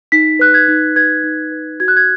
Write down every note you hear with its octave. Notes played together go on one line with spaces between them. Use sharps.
D#4 B6
B4 F#6
G#6
D#4
B4 G#6
D#4
B4
F#4 G#6
F#6
G#6